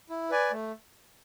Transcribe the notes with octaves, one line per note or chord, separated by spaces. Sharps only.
E4
B4 D5 G#5
A3